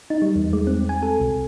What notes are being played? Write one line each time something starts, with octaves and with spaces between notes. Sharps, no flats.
D#4
G3
E2
G#3
C4
G#5
A4
C2